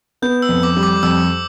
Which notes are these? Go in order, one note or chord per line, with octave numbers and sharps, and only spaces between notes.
B3 G6
E6
F2
D6
G3
D6
F2 E6